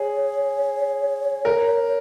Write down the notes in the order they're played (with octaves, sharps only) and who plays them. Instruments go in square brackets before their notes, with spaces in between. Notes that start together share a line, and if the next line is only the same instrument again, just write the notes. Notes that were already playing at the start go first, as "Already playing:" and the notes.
Already playing: [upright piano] G#4 [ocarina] C#5
[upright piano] A#4